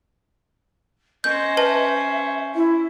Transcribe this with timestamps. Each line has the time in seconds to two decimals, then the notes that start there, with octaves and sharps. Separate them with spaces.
1.24 C#4 C5 D#5 G6
1.57 B4 E5 A5
2.54 E4